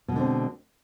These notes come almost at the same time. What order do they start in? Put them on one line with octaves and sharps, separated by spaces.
B2 G#3 D3 C4